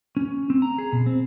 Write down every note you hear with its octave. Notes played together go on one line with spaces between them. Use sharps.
C#4
C4
A#5
G#4
B2
C4